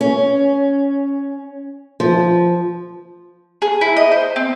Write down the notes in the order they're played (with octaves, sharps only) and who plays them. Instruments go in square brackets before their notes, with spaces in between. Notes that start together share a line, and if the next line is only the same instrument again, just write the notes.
[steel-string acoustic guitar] C#4
F3
[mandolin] G#4
E4
D#5
C5
C4